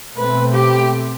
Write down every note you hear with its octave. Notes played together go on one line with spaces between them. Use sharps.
B2 A3 C4 B4
G4